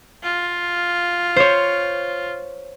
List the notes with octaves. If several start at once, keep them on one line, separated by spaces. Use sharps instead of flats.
F4
C5 C#5